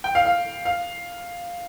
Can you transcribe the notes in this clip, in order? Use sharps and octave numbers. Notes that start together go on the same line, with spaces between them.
G5
F5
F5
F5